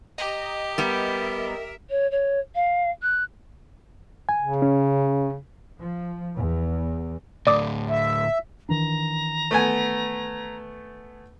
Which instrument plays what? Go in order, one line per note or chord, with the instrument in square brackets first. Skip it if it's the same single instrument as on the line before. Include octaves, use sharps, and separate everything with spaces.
[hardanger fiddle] G4 [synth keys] D#5 A#5
[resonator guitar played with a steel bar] G3 B3 [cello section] A#4 E5
[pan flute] C#5
C#5
F5
F#6
[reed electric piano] G#5
[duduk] C#3
[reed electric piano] C#4
[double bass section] F3
E2
[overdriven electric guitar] D2 A2 [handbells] D5 D6 D#6
[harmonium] E5
[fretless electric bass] D#3 E3 D4 [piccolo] A#5
[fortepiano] A3 B3 G#5